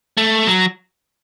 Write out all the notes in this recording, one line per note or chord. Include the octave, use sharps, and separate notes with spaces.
A3
F#3